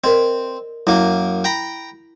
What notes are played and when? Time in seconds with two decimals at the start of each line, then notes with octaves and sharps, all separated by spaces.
0.04 C4 A#4 D5 D#5
0.87 F#2 A#3 E4
1.44 G5 A#5 B5